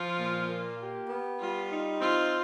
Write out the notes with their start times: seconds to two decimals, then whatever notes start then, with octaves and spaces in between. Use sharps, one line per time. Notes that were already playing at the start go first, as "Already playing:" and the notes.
Already playing: F3 F4
0.19 A#2
0.49 A#3
0.79 G4
1.09 B3
1.40 G3 F4
1.71 D#4
2.01 C4 F4